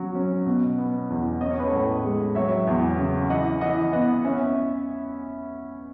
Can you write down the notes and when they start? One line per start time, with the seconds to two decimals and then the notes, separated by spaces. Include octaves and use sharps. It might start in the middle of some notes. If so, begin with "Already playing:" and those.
Already playing: F#3 C#4
0.15 C#4
0.46 B2
0.78 B3
1.10 E2
1.41 C#4 D#5
1.51 C#5
1.59 B4
1.68 A2 A4 C#5
2.04 G#3
2.35 F#3 C#5 E5
2.67 E2
2.99 C#3
3.30 E3 D#5 F#5
3.61 E3 D#5 F#5
3.93 B3 D#5 F#5
4.25 C#4 E5 G#5